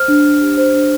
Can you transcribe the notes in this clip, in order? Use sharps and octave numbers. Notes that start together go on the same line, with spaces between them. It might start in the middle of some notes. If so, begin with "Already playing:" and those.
Already playing: C5 F6
D4
D4
G4
C5
D4